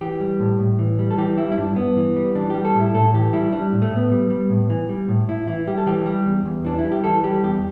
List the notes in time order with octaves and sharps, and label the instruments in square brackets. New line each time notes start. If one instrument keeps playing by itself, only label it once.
[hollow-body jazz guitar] E3 G4
G3
A2
A2
E3
G3
A4
E3 G4
G3 E4
E4
G2 D4
G2 B3
E3
G3
E3 D4
G3 G4
A4
A2 E4
A2 A4
E3 G4
G3 E4
G3 D4
A2
A3
A2
B3
G3
G3
A2
E3
G3
A2
A2 E4
E3 E4
G3 G4
A4
E3 G4
G3
E2
E2
E3 D4
E4
G3
G4
E3 A4
G3 G4
E2 G4